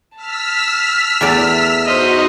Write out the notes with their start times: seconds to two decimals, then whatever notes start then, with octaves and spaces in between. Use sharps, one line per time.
0.16 A5 E6 F6 B6
1.21 E2 A3 D5
1.86 D#4 F#4 C5 D#5